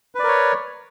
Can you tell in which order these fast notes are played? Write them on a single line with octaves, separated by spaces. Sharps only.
B4 D5 A#4 C#5